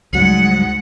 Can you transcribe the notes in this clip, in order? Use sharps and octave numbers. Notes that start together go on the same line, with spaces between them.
C#2 G#2 F#3 G3 F#5